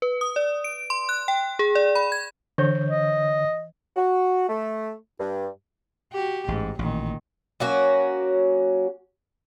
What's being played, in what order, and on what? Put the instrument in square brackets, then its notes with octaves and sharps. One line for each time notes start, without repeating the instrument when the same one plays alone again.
[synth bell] B4
D#6
D5
D7
C6
F#6
G5
G#4
D5
B5
G#6
[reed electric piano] D3 C#5 G6 [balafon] E3
[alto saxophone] D#5
[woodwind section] F#4
A3
G2
[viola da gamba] F#4 G4
[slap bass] A1 [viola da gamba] G#2
[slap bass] A1 [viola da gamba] A#2 D#3
[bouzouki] F#3 A#3 C#4 F#4